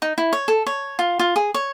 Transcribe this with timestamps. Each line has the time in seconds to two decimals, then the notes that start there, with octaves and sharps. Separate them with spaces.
0.02 D#4
0.18 E4
0.33 C#5
0.48 A4
0.67 C#5
0.99 F4
1.19 F4
1.36 G#4
1.54 C#5